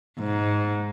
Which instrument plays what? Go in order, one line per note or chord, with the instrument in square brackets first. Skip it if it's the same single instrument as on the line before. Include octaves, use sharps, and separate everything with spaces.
[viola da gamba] G#2